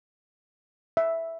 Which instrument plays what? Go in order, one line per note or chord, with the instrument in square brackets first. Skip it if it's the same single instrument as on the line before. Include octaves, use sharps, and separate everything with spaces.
[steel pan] E5